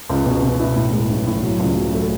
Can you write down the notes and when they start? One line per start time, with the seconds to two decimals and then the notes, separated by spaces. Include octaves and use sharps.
0.09 C#2
0.26 B2
0.42 B2
0.60 E4
0.76 A2
0.93 G#3
1.09 B1
1.26 A2
1.43 F#3
1.59 C#2
1.77 F#3
1.93 A3